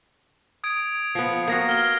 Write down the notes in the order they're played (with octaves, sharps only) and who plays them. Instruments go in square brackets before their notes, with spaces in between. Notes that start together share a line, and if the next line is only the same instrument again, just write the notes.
[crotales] D#6 G#6 D7
[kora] F3 B3
[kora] A#3 F#4 [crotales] G#6 A#6 C7
[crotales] F6 A#6 G7